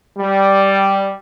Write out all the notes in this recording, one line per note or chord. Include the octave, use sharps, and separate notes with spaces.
G3